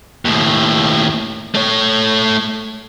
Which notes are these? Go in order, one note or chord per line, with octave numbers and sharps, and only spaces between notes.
D#2 A2
A3 C#5